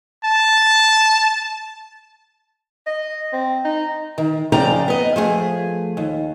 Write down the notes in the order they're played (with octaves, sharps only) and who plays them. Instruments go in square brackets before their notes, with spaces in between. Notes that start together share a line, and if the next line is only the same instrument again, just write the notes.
[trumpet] A5
[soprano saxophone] D#5
C4
D#4
[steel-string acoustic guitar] D#3
F#2 C#3 F3 D5 G5 A#5
B3 D#5
F3 A3 G#4
D#2